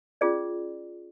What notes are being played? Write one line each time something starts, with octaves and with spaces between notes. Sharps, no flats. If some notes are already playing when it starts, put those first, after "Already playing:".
C#4 F4 G#4 D5